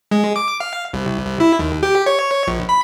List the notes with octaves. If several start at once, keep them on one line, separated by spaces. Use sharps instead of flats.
G#3
D6
F5
C2
C2
E4
D#2
G4
C#5
A#1
B5